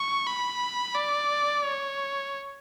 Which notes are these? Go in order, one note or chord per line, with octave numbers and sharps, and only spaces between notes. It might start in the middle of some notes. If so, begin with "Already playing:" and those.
Already playing: C#6
B5
D5
C#5